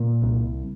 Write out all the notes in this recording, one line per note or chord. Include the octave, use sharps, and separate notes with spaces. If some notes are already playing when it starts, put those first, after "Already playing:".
Already playing: A#2
C2